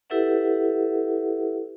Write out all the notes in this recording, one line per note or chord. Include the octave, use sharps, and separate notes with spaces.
E4 G4 A4 B4 E5 F#5